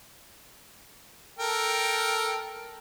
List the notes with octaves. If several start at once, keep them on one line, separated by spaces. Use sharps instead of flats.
A4 A#4 G5